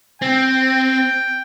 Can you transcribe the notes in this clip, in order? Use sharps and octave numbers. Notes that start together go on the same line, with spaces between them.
C4 G5